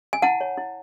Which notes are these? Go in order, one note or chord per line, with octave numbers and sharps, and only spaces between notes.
G#5
E4 F#5 A5
C#5
E4